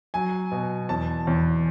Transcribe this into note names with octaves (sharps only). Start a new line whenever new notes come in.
F#3 G#5
B2
E2 A5
E2